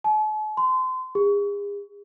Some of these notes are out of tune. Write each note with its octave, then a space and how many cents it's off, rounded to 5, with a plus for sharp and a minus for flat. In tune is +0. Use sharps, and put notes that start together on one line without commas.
A5 -45
C6 -30
G#4 -40